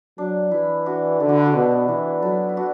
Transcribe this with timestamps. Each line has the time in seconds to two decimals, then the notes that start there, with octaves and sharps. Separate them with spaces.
0.18 F#3 D4
0.51 E3 E4
0.86 D4 F#4
1.20 D3 E4 A4
1.29 D4 F#4
1.37 E4 A4
1.46 D4 F#4
1.55 B2
1.72 B3
1.88 E3 D4
2.22 F#3 E4 A4
2.49 E4
2.57 D4 F#4